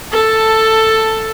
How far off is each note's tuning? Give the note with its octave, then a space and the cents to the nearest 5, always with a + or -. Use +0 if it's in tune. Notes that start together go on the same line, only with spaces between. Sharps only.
A4 +10 A5 +0